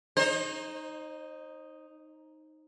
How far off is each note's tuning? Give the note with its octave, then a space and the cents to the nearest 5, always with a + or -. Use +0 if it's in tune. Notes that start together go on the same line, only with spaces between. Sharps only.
D#4 +0 C5 +25 D#5 -30